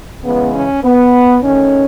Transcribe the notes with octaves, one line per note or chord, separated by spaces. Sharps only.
C#3 E3 G#3 B3
C#4
B3
D#3 A3 C#4